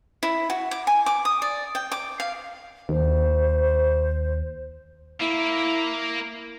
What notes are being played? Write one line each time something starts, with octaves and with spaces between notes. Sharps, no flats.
E4
F#4
D6
G#5
D6
D#6
D5
G5
D6
F5
D#2 C5
A#3 E4